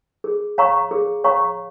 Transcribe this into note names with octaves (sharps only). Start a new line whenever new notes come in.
G#4
C#5 F5 A#5 C#6
G#4
C#5 F5 A#5 C#6